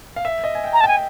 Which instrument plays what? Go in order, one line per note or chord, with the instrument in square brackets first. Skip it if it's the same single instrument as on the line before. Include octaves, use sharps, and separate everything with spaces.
[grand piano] F5
E5
D#5
G#5
G5
[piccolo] A#5
A5
[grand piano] G5 [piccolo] G#5